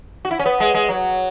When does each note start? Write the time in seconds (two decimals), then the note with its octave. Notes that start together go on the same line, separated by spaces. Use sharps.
0.25 F#4
0.31 E4
0.39 C#4
0.46 B3
0.60 G#3
0.74 G#3
0.89 F#3